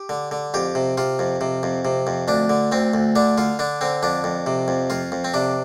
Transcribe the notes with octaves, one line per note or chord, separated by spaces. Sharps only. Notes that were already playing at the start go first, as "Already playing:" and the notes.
Already playing: G4
D3
D3
F2 G4
C3
C3 F4
F2
C3
F2
C3
F2
D2 D4
D3
D2 C4
D2
D3 D4
D3 F4
D3 D4
D3 C4
F2 D4
F2
C3
F2
F2 F4
F2
C4
C3 D4